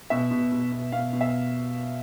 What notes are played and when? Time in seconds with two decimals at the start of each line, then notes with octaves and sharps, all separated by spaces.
0.10 B2 E5
0.31 B2
0.52 B2
0.72 B2
0.92 B2 F5
1.13 B2
1.21 E5